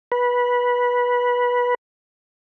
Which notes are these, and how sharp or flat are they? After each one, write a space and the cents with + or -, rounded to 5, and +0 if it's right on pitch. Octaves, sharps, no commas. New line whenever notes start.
B4 -15